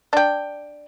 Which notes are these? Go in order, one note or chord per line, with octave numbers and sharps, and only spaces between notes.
D4 G5